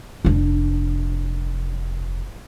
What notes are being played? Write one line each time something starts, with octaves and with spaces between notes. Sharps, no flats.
F1 D4